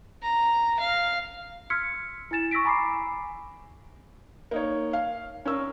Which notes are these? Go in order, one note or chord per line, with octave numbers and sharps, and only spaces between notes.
A#5
F5
C6 E6 F6 G#6 B6 C#7
E4 G#5 A6 E7
C#6 E6 A#6 B6 D7
G#5 A#5 B5 D6 E6 C7
A#3 D#4 C#5
F5
C#4 A#4 E6